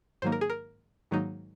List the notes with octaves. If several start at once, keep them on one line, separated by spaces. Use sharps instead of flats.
G#2 D#3 F#3 A#3 D#4 C5
A#4
G#4
A#4
G#2 D#3 F#3 A#3 D#4